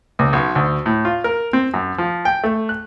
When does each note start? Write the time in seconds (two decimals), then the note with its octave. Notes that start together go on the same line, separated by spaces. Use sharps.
0.19 C#2
0.33 B1
0.55 D2
0.86 A2
1.05 F4
1.24 A#4
1.53 C4
1.74 F#2
1.98 F3
2.25 G5
2.44 A3
2.69 F#6